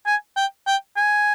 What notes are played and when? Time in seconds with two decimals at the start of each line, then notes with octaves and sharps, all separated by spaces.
0.06 G#5
0.37 G5
0.67 G5
0.97 G#5